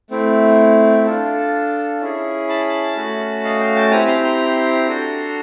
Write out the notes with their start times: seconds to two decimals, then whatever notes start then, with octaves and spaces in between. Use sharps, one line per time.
0.10 A3 C4 E4
1.05 D4 F4 A4
2.01 C#4 E4 G#4
2.49 A5 B5
2.96 A3 C#4 F#4
3.44 D#5 F5
3.59 F5 G5
3.75 G5 A5
3.91 C4 E4 G4 G#5 A#5
4.07 A#5 C6
4.23 A#5 C6
4.87 D4 F#4 A4